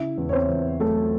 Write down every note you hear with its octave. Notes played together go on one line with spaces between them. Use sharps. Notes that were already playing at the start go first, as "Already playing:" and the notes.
Already playing: C#3 E4 E5
E2
C#5
C4 C5
E2
F#3 A3 A4